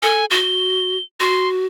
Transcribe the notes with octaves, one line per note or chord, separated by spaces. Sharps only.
A4 G#5
F#4 G7
F#4 C6